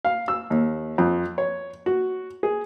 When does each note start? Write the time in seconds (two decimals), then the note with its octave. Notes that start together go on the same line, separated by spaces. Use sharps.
0.05 F5
0.28 E6
0.50 D#2
0.98 F2
1.38 C#5
1.86 F#4
2.43 G#4